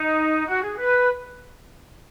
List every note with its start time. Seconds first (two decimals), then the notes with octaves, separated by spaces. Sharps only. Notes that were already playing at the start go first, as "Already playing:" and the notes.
Already playing: D#4
0.47 F#4
0.62 G#4
0.77 B4